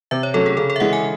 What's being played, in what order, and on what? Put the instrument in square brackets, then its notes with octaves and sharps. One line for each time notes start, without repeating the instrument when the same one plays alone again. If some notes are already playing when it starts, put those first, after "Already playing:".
[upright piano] C3 [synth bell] E5
[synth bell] C#5
[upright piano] F#3 A3 C#4 [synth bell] A4
[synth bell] G#4
[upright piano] C#3 [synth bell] A4
[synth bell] A4
E5
[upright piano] E3 G#3 [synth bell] F#5
[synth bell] G#5